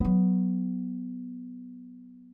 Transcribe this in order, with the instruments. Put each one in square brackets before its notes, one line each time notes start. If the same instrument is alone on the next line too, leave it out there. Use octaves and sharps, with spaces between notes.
[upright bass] F#3 B3